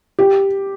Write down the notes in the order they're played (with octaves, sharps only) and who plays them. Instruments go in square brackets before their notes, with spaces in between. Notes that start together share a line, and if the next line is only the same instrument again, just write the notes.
[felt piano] G4